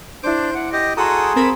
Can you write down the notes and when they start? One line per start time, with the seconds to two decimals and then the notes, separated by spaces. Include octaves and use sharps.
0.23 D4 E4 C5 D6
0.54 F#5
0.73 G4 D#5 A#6
0.97 F#4 G#4 A4 A#5 C6 D#6
1.36 C4 A4 A#4 A5 B5